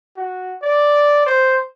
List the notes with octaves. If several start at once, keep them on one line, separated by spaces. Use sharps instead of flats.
F#4
D5
C5